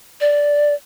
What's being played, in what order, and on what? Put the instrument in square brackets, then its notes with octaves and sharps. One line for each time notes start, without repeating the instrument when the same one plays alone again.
[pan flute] D5